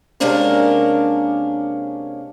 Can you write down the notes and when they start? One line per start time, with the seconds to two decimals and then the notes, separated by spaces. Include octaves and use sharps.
0.20 C3 G#3 A#3 C#4 D4 A#4